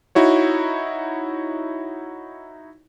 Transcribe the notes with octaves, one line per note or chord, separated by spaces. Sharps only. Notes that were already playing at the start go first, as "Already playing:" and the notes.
D#4 E4 F#4 C#5